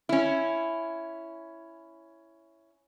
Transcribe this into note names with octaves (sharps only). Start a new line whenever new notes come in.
C#4 E4